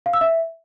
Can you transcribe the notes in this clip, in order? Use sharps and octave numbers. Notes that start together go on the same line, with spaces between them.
F5
E6
E5